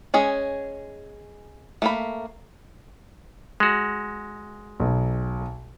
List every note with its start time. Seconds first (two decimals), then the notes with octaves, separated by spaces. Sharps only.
0.14 G#3 C#4 G#4
1.82 A3 A#3 B5
3.60 G#3 F#4
4.80 B1